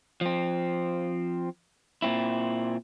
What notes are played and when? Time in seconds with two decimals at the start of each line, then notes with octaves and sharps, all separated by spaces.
0.21 F3 C4
2.02 A#2 C4 E4